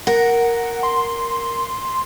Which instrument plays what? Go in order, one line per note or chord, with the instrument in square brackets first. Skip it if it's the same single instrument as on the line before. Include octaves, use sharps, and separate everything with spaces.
[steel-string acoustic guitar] A#4 [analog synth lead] F#5
[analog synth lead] C6